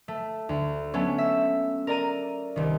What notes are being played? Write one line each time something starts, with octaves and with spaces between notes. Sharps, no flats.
A3
D2
F#3 A3 B3 C#4
E5
A#4 D5 A#5 D#7
C2 D#3